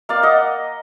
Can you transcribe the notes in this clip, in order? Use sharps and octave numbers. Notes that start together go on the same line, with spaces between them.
A#3 D5 F5
D#5 F#5